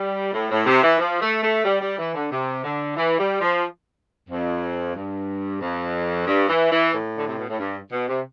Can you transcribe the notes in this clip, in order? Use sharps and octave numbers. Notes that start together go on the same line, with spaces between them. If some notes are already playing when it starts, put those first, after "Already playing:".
Already playing: G3
A2
A2
C3
E3
F3
A3
A3
G3
G3
E3
D3
C3
D3
E3
G3
F3
F2
G2
F2
G2
E3
E3
A2
D3
C3
B2
A2
G2
B2
C3